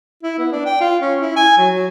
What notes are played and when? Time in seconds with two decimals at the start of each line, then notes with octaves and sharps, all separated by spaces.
0.23 E4
0.38 B3
0.52 D4
0.66 G5
0.81 F4
1.02 C#4
1.21 E4
1.36 G#5
1.58 F#3
1.73 F#3